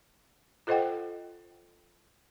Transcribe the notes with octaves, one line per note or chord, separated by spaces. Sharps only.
F4 A4 C5 D#5 F#5 G5